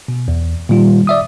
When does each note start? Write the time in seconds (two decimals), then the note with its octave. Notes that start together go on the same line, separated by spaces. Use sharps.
0.08 B2
0.28 E2
0.69 A#2 D#3 G3 F4
1.07 D5 E5 D#6